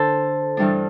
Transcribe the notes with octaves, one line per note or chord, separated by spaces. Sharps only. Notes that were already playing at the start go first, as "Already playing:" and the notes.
Already playing: D3 D4 A4 C5
G2 E3 G3 D4